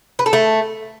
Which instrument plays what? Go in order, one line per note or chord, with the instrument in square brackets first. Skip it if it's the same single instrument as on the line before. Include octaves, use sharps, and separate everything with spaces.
[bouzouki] B4
A4
A3